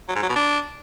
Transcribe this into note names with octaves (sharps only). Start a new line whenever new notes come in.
F#3
G#2
F#3
B2
D4